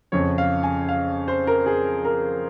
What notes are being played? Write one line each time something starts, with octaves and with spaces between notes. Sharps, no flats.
F2 C#3 F3 C#5
F5
G#5
F5
C5
A#4
G#4
A#4